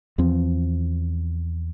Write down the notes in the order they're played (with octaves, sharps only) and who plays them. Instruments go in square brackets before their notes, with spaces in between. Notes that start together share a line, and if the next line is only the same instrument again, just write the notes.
[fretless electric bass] E2 F3 C4